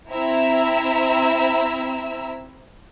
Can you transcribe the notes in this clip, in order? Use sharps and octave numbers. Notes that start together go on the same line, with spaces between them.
C4 E4 E5 A#5 E6